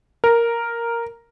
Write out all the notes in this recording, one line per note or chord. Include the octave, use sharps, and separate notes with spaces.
A#4